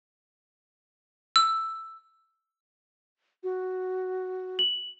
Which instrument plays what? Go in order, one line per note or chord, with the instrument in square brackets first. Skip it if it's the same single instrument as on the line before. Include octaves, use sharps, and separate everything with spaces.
[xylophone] E6
[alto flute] F#4
[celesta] F#7